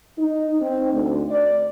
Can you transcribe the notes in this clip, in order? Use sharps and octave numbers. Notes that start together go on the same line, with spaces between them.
D#4
C4
D2
D5